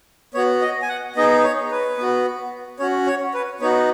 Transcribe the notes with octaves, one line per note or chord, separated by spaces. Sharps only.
B3 F#4 C#5
D#5
G#5
F#5
B3 D#4 G#4 D#5
C#5
B4
B3 F#4
C#4 F#4 C#5
C#5
B4
B3 D#4 F#4 C#5